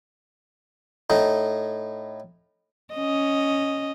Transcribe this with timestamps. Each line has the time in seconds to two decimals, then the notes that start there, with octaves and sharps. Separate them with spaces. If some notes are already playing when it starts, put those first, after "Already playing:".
1.10 A2 D#4
2.94 C#4 D#5